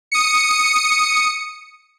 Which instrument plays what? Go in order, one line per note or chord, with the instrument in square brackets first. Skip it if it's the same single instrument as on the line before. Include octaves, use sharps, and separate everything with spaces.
[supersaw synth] D#6 C#7